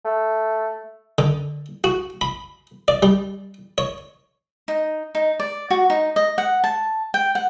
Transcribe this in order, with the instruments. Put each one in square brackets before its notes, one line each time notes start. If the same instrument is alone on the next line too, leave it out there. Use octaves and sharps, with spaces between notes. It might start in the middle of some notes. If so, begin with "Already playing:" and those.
[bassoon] A3
[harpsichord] D3
F#4
B5
D5
G3
C#5
[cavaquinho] D#4
D#4
D5
F#4
D#4
D#5
F#5
A5
G5
F#5